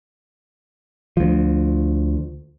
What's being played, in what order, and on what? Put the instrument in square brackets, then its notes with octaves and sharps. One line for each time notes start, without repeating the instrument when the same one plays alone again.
[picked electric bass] D2 F3